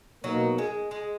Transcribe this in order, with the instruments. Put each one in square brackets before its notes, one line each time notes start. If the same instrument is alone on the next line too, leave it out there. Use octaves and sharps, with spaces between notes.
[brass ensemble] B2 A#3 D#4 A#4 [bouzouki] F#3
[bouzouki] G#3
G#3